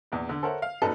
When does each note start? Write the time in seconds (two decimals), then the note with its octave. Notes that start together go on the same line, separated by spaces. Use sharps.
0.12 A#1 E2
0.29 D3
0.43 A4 A#4 C5 C#5 E5 F#5
0.62 F5
0.82 A#1 F#2 D#4 A4 B4